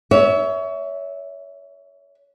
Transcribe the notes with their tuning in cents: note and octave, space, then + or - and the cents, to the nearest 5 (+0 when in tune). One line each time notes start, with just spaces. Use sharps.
C#5 +25 E5 -10